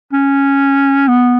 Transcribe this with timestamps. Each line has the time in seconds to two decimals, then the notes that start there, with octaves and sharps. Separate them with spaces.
0.13 C#4
1.08 B3